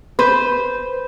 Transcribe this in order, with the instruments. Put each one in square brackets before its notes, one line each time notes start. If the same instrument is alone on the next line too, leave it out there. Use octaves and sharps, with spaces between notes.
[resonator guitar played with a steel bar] B4 C5